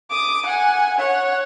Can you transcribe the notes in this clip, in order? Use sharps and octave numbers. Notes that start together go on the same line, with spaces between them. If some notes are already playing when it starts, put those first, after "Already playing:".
D6 D#6
F#5 G#5
C#5 F#5